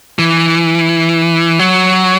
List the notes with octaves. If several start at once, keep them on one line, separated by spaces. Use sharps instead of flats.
E3
F#3